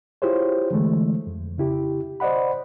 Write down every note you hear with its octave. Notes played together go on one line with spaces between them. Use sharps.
E4 F4 G4 G#4 C5 C#5
D3 E3 G#3 A3
F2
C#3 E4 G4
C5 D5 D#5 F#5 B5